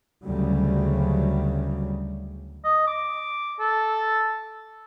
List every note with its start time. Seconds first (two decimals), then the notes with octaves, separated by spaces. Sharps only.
0.25 D2 C#3 F#3 G3
2.64 D#5
2.87 D6
3.60 A4